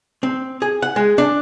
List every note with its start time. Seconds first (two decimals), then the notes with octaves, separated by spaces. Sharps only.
0.23 C4
0.62 G#4
0.82 F#5
0.96 G#3
1.18 D4